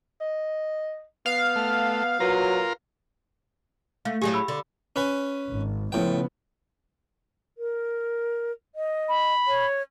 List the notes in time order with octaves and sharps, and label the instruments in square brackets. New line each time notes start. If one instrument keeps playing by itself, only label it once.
[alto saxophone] D#5
[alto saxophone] B3 [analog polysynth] F5
[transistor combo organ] A3
[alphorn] F#3 [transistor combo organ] F4 A#4 [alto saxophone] B4
[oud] A3 [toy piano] F5
[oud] A2 F#3 G#4 [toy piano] G4
[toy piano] B5 E6
[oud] D3
[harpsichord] C#4 B4 G#5
[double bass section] G#1
[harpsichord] A2 G5 [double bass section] C#3 F3 B3
[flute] A#4
D#5
[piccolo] B5
[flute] C#5